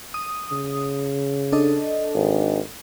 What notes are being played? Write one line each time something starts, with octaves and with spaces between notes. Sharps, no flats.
D#6
C#3
D4 A4 D#5
G#1